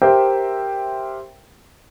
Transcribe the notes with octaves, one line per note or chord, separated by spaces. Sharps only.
G4 A#4 C5 E5 G5